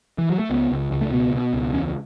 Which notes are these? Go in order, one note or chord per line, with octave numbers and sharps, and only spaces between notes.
E3
F#3
A3
C#2 B3
C#2
C#2
A3
B2 B3
B2
C#2
E2 C#4